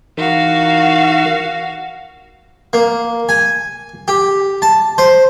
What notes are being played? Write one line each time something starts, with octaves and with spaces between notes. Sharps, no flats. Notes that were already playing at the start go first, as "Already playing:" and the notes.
E3 D#4 F#4 A#4 F5
A#3
G#5
G4
A5
C5